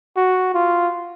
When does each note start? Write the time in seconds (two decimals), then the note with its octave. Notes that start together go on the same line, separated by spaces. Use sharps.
0.16 F#4
0.54 F4